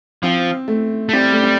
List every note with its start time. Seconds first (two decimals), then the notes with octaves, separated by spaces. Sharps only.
0.23 F3 C4
0.68 A3
1.09 A3
1.13 G3 C4
1.32 A3
1.43 C4